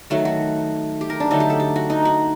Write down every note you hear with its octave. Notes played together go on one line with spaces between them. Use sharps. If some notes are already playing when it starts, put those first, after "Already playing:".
D#3 F#3 A3 F#4
F#4
G4
A#4
D4
D3 F#3 A3 D#4
G4
A4
G4
F#4
D#4
F#4